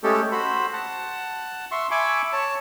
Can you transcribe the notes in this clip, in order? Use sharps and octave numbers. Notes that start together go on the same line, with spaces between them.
G#3 A3 C#4 G4 A4
F#4 C5 B5
F#5 A5
E5 C6 C#6
E5 G#5 B5 C#6 D6
C#5 A5